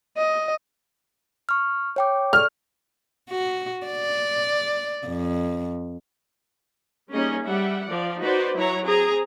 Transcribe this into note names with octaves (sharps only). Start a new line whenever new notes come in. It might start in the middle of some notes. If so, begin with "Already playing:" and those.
D#5
C#6 F6
C#5 G5 D6
A4 D5 C#6 F6
F#4
D5
F2
G3 A#3 C#4 D#4 G#4 D#5
G3 E5 F#5
F3 D5
D#4 F#4 B4 C5 D5
F#3 E4 C#5 A#5
C4 G#4 A#5